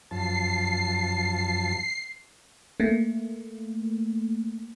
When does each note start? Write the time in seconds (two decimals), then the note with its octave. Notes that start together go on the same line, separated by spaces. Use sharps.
0.11 F#2 F3 A5 C7
2.80 A3 A#3